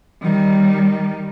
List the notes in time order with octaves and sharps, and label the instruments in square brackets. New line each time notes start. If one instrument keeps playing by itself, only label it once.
[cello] D#3 G3